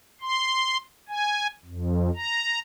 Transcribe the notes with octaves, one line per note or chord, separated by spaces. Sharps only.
C6
G#5
F2
A#5